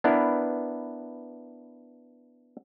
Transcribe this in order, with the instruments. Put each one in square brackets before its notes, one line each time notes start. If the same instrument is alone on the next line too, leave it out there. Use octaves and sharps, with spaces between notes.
[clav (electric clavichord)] B3 D4 E4 A#4 B4